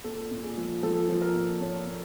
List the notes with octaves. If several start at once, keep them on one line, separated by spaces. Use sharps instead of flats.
A#2 A4
A#2
G#4
F3
F3 A4
F3
A#4
A#2
A#2 C#5
A#2